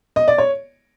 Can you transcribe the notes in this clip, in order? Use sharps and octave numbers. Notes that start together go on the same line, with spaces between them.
D#5
D5
C#5